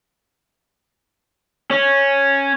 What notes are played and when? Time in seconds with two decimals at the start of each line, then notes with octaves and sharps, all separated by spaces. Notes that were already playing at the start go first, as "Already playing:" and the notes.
1.71 C#4